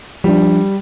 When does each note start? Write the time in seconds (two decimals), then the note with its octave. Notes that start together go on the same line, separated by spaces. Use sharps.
0.24 F3 G3 D4